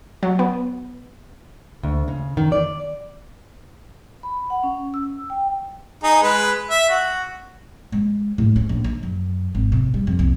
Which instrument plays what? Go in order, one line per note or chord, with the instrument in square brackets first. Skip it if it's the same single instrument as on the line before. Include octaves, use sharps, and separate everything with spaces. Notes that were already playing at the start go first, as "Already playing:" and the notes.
[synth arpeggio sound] F#3
B3
[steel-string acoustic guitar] D2
C#3
D#3
D5
[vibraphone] B5
F#5
C#4
E6
G5
[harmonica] D#4 G#4
G#3 B4
E5
F#4
[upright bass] G#3
A2
C#4
A#1
D#3
F#2
G#1
C3
G3
F2
C2